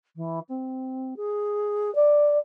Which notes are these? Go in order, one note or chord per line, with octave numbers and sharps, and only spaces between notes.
E3
C4
G#4
D5